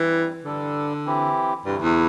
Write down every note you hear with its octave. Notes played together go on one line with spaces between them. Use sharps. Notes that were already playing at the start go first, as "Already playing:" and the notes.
Already playing: G2 E3 G3 C4
G2 D3 G3 D4 A4
E3 C4 E4 G4
D2 G2 C3 E3 A3 E4
E2